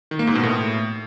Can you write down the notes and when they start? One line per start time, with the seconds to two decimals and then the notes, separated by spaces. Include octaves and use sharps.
0.11 D#3
0.19 A#3
0.27 G#2
0.35 B2
0.43 A2